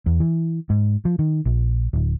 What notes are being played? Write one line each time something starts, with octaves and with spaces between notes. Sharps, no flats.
E2
E3
G#2
F3
D#3
A#1
D1